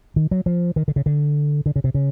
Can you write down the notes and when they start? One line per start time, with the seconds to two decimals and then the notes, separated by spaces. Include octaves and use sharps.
0.16 D#3
0.31 F#3
0.46 F3
0.76 D#3
0.88 D3
0.96 C#3
1.06 D3
1.66 D3
1.76 C#3
1.84 C3
1.94 C#3